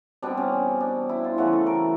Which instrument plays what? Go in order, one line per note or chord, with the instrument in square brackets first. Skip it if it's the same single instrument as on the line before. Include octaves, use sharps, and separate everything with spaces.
[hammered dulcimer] B2 G3 C4 D4
C#4
D4
E4
F4
C#3 E3 A3 F#4
A4
A#4